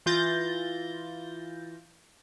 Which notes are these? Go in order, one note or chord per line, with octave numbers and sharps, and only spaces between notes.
E3 F4 G6 A6 A#6